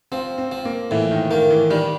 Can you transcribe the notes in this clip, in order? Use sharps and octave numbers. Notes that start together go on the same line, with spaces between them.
F3 C4
C4
F3
A#3
A2 E3
D#3
D#3 A#3
E3
D#3 G3